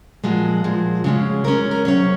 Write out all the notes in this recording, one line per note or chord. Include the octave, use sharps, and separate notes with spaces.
A#2 F3 G#3 F#4
A#2 F3 G#3
C#3 G#3 C#4
C#3 G#3 C#4 A#4
A#4
C3 F#3 C#4 C#5